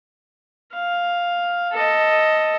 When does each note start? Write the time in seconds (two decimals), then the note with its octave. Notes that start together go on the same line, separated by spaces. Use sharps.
0.73 F5
1.73 A4 D#5